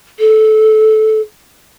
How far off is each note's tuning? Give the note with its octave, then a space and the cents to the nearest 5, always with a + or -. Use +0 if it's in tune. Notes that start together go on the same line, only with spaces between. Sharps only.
A4 -15